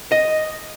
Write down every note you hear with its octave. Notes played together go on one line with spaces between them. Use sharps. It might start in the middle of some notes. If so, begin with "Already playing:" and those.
D#5